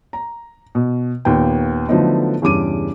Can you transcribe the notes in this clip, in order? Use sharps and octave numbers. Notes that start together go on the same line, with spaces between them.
A#5
B2
D#2 A#2 B3 G5
D3 F3 F#3 A3 B3 D#4
E2 G2 C#3 D6 D#7